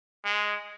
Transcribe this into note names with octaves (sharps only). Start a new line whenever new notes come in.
G#3